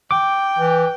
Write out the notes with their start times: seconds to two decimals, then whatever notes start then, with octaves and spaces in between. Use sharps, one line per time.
0.11 G5 D6
0.58 E3